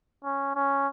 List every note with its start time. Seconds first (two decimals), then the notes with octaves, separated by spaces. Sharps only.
0.25 C#4
0.55 C#4